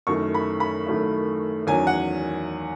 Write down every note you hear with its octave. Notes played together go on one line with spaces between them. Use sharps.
F#2 D#3 A3 E4 C#6
B5
B5
F#2 D#3 A3 E4
E2 D#3 F#3 C#4 G#5
F#5